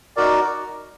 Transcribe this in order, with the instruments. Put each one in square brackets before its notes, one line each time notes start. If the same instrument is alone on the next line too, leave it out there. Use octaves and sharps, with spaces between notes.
[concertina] D#4 F#4 A#4 D5